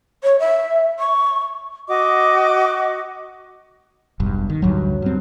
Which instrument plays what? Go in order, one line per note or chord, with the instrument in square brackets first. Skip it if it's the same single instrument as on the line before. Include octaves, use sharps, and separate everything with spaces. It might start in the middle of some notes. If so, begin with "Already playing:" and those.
[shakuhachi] C#5
E5
C#6
[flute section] F#4 D#5 D6
[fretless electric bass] E1 B1 G2
D#3
[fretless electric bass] A1 D2 G2 [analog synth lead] F#3
[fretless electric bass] G2 C4